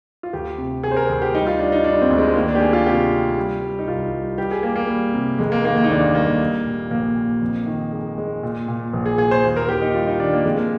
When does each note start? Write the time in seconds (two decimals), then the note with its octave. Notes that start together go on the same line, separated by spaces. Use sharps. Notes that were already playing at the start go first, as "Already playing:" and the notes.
0.23 F4
0.33 D2 G4
0.58 C3
0.83 C3 G#4
0.91 C5
0.97 A#4
1.09 D2
1.22 G4
1.34 G3 D#4
1.47 F4
1.59 G3 D4
1.72 D#4
1.84 G3 D4
2.02 C4
2.10 D2
2.18 G#3
2.35 D#3 A#3
2.48 D4
2.55 G4
2.60 G#3 G#4
2.73 F4
2.87 C3 G4
3.12 C3
3.37 G3
3.62 G3
3.79 D#4
3.87 C2 F4
4.13 G3
4.37 G3 G4
4.51 G#4
4.63 G3 A#3
4.76 A#3
4.88 G3
5.14 C3
5.39 F1 G#3
5.52 A#3
5.64 D#3 A#3
5.78 A#3
5.84 D#4
5.90 D#2 D4
6.15 G3 A#3
6.40 G3
6.66 A#2
6.91 A#1 A#3
7.16 A#2
7.42 F2
7.66 D#3
7.93 G#3
8.18 G#3
8.43 A#2
8.68 A#2
8.94 A#1
9.06 G#4
9.18 A#2 G#4
9.31 C5
9.44 D#2
9.56 A#4
9.69 D#2 G4
9.82 D#4
9.94 G3 F4
10.07 D#4
10.19 D#3 D4
10.33 A#3
10.44 F2 G#3
10.58 A#3